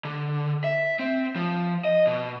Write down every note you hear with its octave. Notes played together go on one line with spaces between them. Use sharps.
D3
E5
C4
F3
D#5
B2